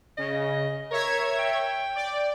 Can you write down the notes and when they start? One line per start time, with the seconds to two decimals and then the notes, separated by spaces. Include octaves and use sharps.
0.18 C#3 D#5
0.91 A#4 C#5 E5 G#6
1.39 G5
1.95 D5